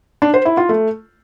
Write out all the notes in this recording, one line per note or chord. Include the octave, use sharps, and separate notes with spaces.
D4
C5
E4
F4
A3